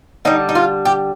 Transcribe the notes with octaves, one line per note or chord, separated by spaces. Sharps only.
D3 G3 D#4
D#4
F4
G4